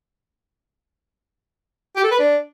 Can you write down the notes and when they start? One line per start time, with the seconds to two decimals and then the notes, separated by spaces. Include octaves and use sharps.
1.96 G4
2.04 A4
2.11 B4
2.19 D4